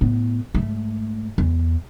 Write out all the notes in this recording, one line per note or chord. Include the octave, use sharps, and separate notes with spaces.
A2 B3
G#2 A3
E2